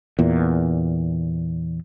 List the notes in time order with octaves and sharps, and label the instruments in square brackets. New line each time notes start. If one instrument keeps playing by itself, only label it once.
[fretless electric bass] E2 A#2